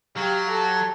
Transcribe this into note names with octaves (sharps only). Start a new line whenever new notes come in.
F#3 G4 F5
A4